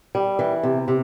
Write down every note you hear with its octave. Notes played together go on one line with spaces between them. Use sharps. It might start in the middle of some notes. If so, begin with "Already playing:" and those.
G3
E3
C3
C3